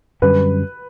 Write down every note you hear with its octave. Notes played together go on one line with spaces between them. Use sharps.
F#2 D3 G3 C#4 B4